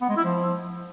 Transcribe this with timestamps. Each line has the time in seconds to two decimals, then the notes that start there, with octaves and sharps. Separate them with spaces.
0.01 B3
0.09 G#3
0.17 E4
0.25 F3